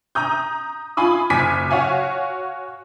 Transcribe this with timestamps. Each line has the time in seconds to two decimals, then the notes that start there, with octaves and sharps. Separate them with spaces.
0.15 A#5 D#6 G6
0.97 F4 G#5 B5 D#6
1.30 F#1 G#5 D6 B6
1.71 F#4 C#5 F5 G#5